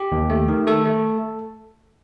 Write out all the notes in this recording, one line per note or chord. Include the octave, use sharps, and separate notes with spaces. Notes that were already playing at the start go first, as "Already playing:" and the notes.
Already playing: G4
D#2
A3
D#3
A3 A4
A3